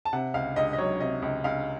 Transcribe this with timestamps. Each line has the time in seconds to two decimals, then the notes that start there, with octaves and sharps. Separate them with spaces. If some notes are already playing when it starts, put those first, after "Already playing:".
0.05 A5
0.13 C3 F#5
0.34 C#2 F5
0.56 C#2 D#5
0.73 D#5
0.78 F#3 C#5
1.00 C3 D#5
1.22 C#2
1.44 C#2 F5